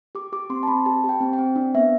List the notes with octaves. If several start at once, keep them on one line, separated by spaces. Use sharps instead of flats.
G4 D6
G4 D6
C4 C6
A5
C4 B5
G4 A5
G4
G5
C4
G5
C4
D4
B3 E5